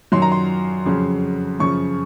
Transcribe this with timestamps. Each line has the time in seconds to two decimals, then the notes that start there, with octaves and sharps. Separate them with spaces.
0.12 F#2 D#3 F#3 C6
0.22 A#5
0.32 C6
0.85 F2 C#3 F#3
1.60 F#2 C#3 F3 C#6